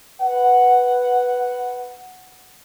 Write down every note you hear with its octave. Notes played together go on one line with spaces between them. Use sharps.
B4 F#5